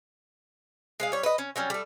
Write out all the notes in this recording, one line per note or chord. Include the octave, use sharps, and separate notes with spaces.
G#3 G#4 F5
G3 C#5
B4 D#5
C#4
F#3 G3 C#4
G3 A3